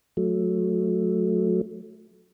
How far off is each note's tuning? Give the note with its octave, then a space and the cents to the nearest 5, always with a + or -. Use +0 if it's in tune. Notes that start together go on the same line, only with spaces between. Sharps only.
F#3 -20 A3 -15